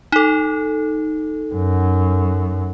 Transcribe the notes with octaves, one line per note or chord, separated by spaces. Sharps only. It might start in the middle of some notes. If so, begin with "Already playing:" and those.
D#4 A4
F#2